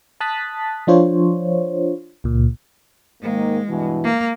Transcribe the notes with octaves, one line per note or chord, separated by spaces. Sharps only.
A5 D#6 F#6 A6 B6
F3 D4 F4 C5 C#5
C#2 A#2
G#2 D#3 G#3 A#3
G2 B2 E3
A#3